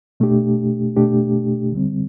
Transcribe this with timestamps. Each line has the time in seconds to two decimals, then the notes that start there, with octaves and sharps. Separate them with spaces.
0.20 B2 A3 D4 G4
0.96 B2 A3 D4 G4
1.72 D3 G3 C4